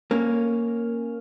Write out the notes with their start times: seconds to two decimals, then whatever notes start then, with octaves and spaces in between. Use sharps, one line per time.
0.11 A#3 C#4